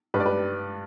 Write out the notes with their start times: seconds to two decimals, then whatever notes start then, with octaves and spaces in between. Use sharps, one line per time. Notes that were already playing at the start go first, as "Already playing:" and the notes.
0.14 G2 G3 B4
0.20 D5
0.26 B4